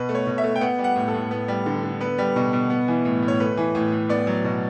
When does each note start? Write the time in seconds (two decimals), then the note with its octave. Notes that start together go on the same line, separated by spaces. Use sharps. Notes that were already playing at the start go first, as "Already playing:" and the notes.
Already playing: B2 B4
0.09 A3
0.15 C#5
0.27 B2
0.38 E5
0.44 A3
0.56 G5
0.61 B3 F#5
0.79 G3
0.84 F#5
0.96 A2
1.08 A4
1.14 A2
1.31 B3
1.48 G3
1.66 D3
1.83 D3
2.00 B3 B4
2.18 G3
2.36 B2
2.53 B2
2.70 B3
2.88 E3
3.05 A2
3.23 A2
3.28 C#5
3.40 A3 B4
3.57 E3
3.75 A2
3.92 A2
4.09 B3 D5
4.27 F#3
4.44 B2